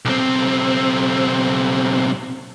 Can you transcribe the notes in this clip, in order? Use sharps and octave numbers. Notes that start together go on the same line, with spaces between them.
B1 C4